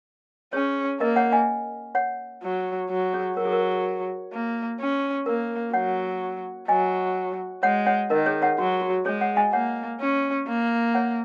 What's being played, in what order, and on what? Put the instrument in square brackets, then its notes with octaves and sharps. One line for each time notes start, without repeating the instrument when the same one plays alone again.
[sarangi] C#4 [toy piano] G#4 C#5
[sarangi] A#3 [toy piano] A#4 D#5
[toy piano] C#5 F#5
D#5 G#5
C#5 F#5
[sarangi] F#3
F#3
[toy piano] G#4 C#5
[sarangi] F#3 [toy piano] A#4
[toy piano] G#4
A#4
[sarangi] A#3
C#4
[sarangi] A#3 [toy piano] A#4
[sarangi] F#3 [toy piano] C#5 F#5
[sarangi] F#3 [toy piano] D#5 G#5
[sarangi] G#3 [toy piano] C#5 F#5
[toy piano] C#5 F#5
[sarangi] D#3 [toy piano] A#4 D#5
[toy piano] G#4 C#5
C#5 F#5
[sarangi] F#3 [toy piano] F#4
[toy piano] F#4
[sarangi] G#3 [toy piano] G#4 C#5
[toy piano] C#5 F#5
D#5 G#5
[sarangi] A#3 [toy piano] C#5 F#5
[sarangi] C#4
A#3
[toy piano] C#5 F#5